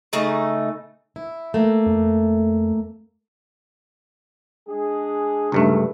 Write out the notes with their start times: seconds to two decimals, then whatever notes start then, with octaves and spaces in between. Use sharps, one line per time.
0.13 C#3 A3 D#4
1.16 E4
1.54 A3 A#3
1.86 F2
4.68 G#3 D4 G#4
5.52 C#2 G2 C3 D#3 A3